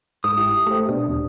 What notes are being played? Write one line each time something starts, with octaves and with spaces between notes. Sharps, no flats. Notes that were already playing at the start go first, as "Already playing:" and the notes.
G#2 D#6
G1 E4 G4
A3 G4 C5
B2 D4
D#1